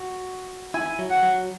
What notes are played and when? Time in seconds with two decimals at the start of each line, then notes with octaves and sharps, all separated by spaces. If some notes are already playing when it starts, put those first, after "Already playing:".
Already playing: F#4
0.74 E4 G#5
0.99 F#3
1.10 F#5
1.23 F#3